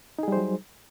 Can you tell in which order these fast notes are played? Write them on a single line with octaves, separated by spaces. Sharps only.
D#4 G#4 G3 C5 F#3